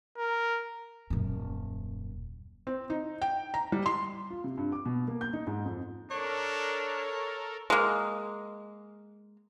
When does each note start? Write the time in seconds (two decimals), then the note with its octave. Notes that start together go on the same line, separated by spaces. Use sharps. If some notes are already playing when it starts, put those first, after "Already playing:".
0.18 A#4
1.10 D#1 F#2
2.67 C4
2.90 D#4
3.22 G5
3.54 A#5
3.72 G3
3.86 C6
4.30 F4
4.44 C3
4.57 G2
4.72 D6
4.85 B2
5.08 A#3
5.21 G6
5.33 D#4
5.47 G#2
5.65 F2
6.11 D4 A4 A#4 C#5
7.70 G#3 A#3